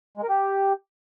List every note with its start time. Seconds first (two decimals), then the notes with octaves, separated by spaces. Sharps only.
0.17 G#3
0.23 A#4
0.29 G4